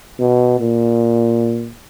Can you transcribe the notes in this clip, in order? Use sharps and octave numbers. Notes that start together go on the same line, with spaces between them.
B2
A#2